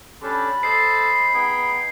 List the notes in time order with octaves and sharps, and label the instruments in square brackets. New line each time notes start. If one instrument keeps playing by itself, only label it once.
[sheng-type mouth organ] C#4 G4 A4 [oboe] D4 [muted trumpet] B5
[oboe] A4 [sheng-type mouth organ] C5 D#5 [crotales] C7
[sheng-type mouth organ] B3 D#4 G5 [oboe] G#4